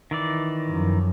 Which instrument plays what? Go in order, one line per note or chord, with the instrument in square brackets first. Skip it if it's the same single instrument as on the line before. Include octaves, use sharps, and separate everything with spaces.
[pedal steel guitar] D#3 E3 D5
[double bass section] F#2 F3